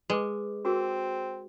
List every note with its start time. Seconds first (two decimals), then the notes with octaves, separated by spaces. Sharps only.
0.10 G#3 B4 D6
0.65 C4 F#4 G#4 A#4